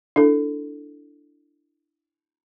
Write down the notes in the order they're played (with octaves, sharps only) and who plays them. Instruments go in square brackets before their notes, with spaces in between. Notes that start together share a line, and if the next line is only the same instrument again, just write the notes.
[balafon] D4 E4 A4